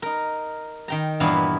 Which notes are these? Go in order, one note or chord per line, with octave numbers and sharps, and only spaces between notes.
D#4 A#4
D#3 G5 A#5
G2 A#2 E3 B3 F5